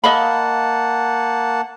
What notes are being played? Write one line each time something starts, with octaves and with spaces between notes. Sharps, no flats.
A#3 D#5 F5 F#5 A5 B5